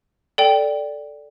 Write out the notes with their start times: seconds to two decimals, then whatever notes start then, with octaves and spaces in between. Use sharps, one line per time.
0.38 A4 D5 G5